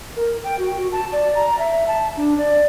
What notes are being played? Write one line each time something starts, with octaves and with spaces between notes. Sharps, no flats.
A#4
G5
F#4
F#4
A5
D5
A#5
E5
A5
D4
D5